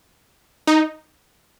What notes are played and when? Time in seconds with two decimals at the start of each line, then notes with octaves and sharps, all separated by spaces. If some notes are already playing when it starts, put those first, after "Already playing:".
0.67 D#4